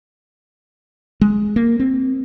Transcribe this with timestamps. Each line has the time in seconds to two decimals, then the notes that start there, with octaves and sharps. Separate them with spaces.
1.21 G#3
1.56 A#3
1.80 C4